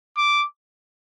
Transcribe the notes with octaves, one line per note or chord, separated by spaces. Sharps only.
D6